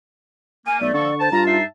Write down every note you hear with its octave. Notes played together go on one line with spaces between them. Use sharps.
A#3 G#5 D#7
B1 A3 D5
D3 F3 A#3 A4 C#6
C5 A5
G2 F4 A#5
D#4 E5 A5 C7